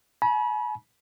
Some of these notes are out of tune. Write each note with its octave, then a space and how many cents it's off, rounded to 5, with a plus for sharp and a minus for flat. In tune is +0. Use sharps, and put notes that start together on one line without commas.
G#5 +45 B5 -35